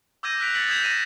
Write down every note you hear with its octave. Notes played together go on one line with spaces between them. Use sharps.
D6 E6 G6 G#6 A#6 D#7
F#6 B6 D7 F7
A6 B6 C#7 F#7
D#6 G6 G#6 B6 E7
A#6 D#7 E7